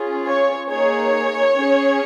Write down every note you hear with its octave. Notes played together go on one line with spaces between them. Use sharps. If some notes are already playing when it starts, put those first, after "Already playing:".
Already playing: C#4 F4 G#4
C#5
A#3 D#4 G#4 C#5
C#4 G#4